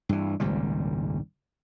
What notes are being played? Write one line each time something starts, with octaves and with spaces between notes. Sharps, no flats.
G2 E3
G#1 C#2 A#2 G3